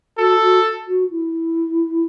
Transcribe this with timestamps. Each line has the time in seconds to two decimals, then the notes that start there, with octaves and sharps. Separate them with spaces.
0.17 F#4 A4
0.41 F#4
0.87 F#4
1.10 E4